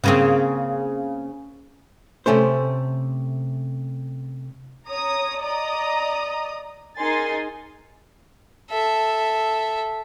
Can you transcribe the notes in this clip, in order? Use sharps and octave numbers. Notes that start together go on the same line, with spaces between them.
C#3 A#3 C4
C3 A3 C#4 C5
C#5 A#5 D#6
D5 D#5 A#5 D#6
D#4 G#4 A#4 G#5 C6 A6
A4 E5